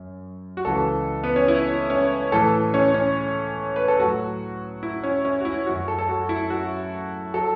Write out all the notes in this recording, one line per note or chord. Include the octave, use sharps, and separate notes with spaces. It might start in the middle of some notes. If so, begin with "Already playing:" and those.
Already playing: F#2
F#4
C#2 C#3 E3 A4
B3
C#4
E4
C#4
A2 E3 A4
C#4
C#4
B4
A4
A2 F#3 F#4
E4
C#4
C#4
F#4
E4
F#2 F#3 F#4
A4
A4
F#4
E4
F#4
F#3 A4